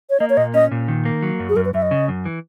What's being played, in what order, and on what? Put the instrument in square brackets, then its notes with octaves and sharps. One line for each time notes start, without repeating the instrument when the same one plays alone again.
[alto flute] C#5
[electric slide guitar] A#3 [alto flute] D#5
[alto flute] C#5
[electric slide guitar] A#2 [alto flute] D#5
[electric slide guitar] C#4 [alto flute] D#5
[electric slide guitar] A#2
D#3
A#3
F#3
F#2
[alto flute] G#4
[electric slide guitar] F#2 [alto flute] A#4
[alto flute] B4
[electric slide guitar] F#2 [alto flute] E5
[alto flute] D#5
[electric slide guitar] C#3
F#2
E3